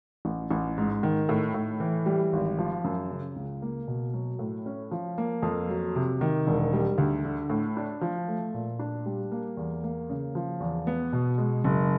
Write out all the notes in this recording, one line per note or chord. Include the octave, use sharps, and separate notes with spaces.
A1
A1
G#2
D#3
A2
A2
E3
G3
G#1
F3
F#2
C#3
C#2
A#3
B2
F#3
A2
C#4
F3
A#3
F2
F#3
C3
D#3
E1
G3
D2
D3
A2
D4
F3
A3
A#2
D4
G3
A#3
E2
A#3
C#3
F3
E2
B3
B2
G#3
F#1